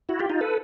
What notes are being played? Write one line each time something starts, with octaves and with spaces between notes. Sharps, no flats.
E4 F#4
F4 G4
D#4 F4
A4 B4